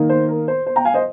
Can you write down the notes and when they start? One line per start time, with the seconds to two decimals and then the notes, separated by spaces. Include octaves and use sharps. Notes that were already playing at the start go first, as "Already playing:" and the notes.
Already playing: D#3 A#3 D#4
0.09 C5
0.28 A#4
0.48 C5
0.66 C5
0.76 G5 A#5
0.85 F5 G#5
0.94 C5 D#5